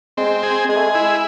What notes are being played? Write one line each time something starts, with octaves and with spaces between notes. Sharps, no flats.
G#3 C4
G#4
G#3 G#4
A3
G#3
E4